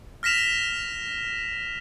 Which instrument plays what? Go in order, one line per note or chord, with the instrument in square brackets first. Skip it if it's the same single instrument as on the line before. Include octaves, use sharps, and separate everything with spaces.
[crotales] F6 A#6 B6 E7 F7